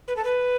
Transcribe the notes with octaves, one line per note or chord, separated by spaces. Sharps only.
B4
A4
B4